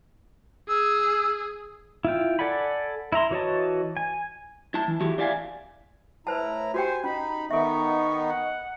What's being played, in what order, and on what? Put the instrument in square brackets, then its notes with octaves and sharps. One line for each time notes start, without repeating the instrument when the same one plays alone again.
[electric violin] G#4 [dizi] E6
[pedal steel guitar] E4 F4 G5
A4 D5 F#5 G#5 B5
E4 E5 A#5 C6
E3 F#4 C#5 D#5 A5
G#5
[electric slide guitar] E4 A5
E3
E4 F#4 G4
D4 G4 D5 E5 F5 G#5
[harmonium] A2 E4 A#5 [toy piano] B4 C5 A5
[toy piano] F#4 G4 G5 [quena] C5 [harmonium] G#5
[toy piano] C#4 [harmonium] D#4 [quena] B5
[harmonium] D#3 B3 D#4 [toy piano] A4 E5 [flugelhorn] D#5 [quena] C#6
[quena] F#5